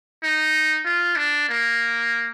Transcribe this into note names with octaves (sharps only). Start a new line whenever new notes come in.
D#4
F4
D4
A#3